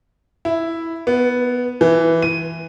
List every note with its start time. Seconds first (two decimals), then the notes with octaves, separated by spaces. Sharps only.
0.45 E4
1.07 B3
1.81 E3
2.22 D#7